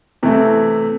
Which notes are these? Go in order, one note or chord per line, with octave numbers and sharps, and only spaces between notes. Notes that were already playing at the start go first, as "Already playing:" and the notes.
C3 E3 A3